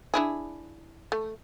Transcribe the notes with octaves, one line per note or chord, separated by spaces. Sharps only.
D4 E4 G#4
A3